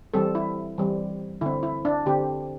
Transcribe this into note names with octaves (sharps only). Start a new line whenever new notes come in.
E3 G3 C4 A4
E4
E3 G3 C4
D3 C4 E4
E4
D4
D3 C4 G4